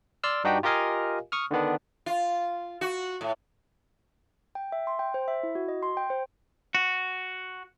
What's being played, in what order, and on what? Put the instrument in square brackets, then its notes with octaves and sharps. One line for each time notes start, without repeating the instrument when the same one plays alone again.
[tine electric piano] D5 C6 E6 F6
G2 D4 D#4 F#4 G4 G5
F4 G4 A#4 D#5 F5 G#5
C#6 D#6 F6
D3 D#3 B3 D4
[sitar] F4
F#4
A2
[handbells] G5
E5
C6
G5
C5
E5
E4
F#4
D#5
C6
G5
C5
[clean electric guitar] F#4